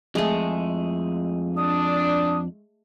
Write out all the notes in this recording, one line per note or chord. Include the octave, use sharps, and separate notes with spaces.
F2 G#3 A3 G#4
D4 D#6